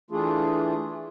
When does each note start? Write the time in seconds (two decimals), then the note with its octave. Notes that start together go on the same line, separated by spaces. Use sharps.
0.11 E3 A3 D4 F4 G#4